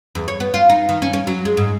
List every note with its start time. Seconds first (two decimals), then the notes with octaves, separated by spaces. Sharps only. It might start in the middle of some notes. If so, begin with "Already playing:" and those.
0.15 E2
0.28 C#5
0.40 B3
0.54 F4
0.70 D#4
0.89 D#3
1.02 C#4
1.13 C#4
1.27 F#3
1.45 G#3
1.57 G#2